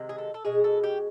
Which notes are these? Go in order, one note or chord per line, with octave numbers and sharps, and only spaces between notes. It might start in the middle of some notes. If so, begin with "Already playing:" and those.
Already playing: C3 D#3 G#3
G#4
A4
A4
B2 G#3 G#4
A4
G4